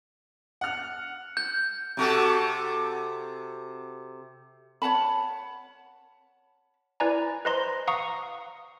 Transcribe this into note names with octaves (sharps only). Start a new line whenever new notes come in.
F#5 F6
G6
C3 F#4 A4
C#5 F#5 A5 B5
E4 B4 D5 G#5 A#5
B4 C5 D#5 A#5 C6
F5 F#5 A#5 C#6 D#6